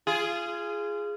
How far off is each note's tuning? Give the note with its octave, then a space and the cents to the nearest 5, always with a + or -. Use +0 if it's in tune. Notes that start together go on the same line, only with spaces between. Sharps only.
F4 -25 G#4 +0